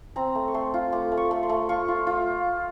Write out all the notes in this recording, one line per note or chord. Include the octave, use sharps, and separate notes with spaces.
C4 A#5
A3
C#6
A3 C6
F4
A3 D6
A3
C#6
A3
C6
A3
F4 C#6
F4
F4